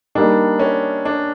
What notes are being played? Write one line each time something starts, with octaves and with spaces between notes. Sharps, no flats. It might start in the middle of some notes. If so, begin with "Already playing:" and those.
D#3 G3 A#3 D4 D#4
C#4
D4